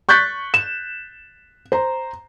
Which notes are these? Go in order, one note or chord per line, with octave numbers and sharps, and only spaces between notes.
C#6 F#6 G6 A6 B6
E7
C5 A#5